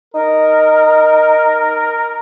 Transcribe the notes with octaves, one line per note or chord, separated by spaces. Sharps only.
D#4 A#4